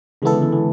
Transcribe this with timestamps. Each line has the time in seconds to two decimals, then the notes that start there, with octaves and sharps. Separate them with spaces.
0.22 C#3 E3 G#3 B3 E4 A4
0.32 D3
0.42 E3
0.53 E3